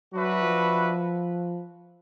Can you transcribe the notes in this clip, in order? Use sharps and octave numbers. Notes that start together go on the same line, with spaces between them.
F#3 D4 F#4 B4 E5
F3